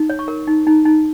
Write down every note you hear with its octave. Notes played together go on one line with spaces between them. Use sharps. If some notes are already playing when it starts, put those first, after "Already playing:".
Already playing: D#4
C#5
C#6
A#4
D#4
D#4
D#4